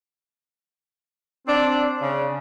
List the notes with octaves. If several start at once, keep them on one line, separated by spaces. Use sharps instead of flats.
C4 D4
C#3